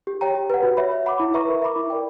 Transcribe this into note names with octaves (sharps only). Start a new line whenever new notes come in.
G4
C#5 G5 A#5
G4
B4 F#5
F#4
C#5 E5 B5
C#5
F#5 B5 D6
E4
B4 E5 A#5 C#6
A#4
E5 B5 D6
E4
A#4 D5 G5